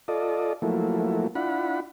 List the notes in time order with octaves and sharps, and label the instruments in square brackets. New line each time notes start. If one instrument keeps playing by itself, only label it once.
[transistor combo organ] F4 A4 D5 D#5
F3 F#3 A3 A#3 E4
D4 E4 F4 F#5 B5